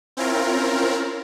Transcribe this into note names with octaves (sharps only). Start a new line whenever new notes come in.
C4 C#4 E4 F4 A#4